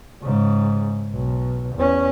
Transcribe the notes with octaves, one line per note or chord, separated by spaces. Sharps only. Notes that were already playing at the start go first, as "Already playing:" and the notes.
G#2 C#3
B1
E2 C#4